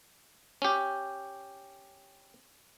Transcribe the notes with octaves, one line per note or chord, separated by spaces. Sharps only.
C#4 G4